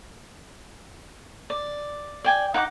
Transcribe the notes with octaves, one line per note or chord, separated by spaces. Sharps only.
D5
D5 G5 G#5
D#4 F#5 G#5 D6